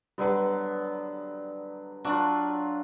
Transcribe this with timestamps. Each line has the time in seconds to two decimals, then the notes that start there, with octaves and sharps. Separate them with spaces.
0.18 D3 F#3 G3 B3 B4
2.04 F#3 D4 F4 F#4